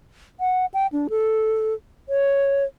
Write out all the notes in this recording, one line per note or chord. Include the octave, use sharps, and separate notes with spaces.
F#5
G5
D4
A4
C#5